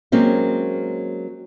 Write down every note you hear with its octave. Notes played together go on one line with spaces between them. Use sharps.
F#3 G#3 A#3 C4 C#4